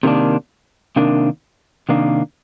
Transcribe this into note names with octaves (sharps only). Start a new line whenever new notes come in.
C3 D#3 A#3 D4
C3 D#3 A#3 D4
C3 D#3 A#3 D4